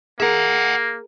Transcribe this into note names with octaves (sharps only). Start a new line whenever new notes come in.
A#3 G#4 A#4 E5 F#5